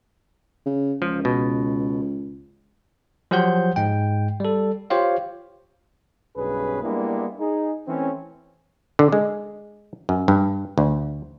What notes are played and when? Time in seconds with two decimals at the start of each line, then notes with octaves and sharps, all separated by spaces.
0.66 C#3
1.02 C#2 F3
1.25 B2
3.31 F3 F#3 G4 C5 F#5 G6
3.76 G#2 G#3 G5
4.40 G3 A4
4.90 F4 G4 C5 C#5 F5
6.37 B1 G2 C#4 G#4 B4
6.83 G3 G#3 A#3 B3 D4 E4
7.40 D#4 G#4
7.87 E3 A3 C4 C#4
8.99 D3
9.12 G#3
10.09 F#2
10.28 G2
10.78 D2